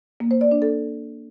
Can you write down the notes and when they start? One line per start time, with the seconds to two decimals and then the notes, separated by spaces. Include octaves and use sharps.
0.20 A#3
0.31 C5
0.41 D5
0.51 D4
0.62 A4